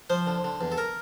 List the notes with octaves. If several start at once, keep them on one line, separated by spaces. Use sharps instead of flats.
F3 C5
D3
D3
E2
A4
A#4